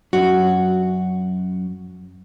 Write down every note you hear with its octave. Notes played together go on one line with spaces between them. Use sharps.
F#2 F#4